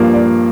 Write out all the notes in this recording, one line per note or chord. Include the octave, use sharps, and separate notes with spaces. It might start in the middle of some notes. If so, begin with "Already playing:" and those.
Already playing: G2 F3 A#3
D5